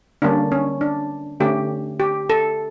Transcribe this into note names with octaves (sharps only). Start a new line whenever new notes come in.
D3 G3 A#3 C#4 D4
C#4
D4
D3 A3 C#4 G4
G4
A4